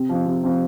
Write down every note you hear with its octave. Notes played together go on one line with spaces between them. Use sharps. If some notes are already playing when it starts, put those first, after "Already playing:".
Already playing: C3
F3 C4
C3
F3 C4